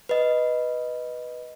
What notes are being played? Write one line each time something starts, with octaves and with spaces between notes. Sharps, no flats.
B4 D#5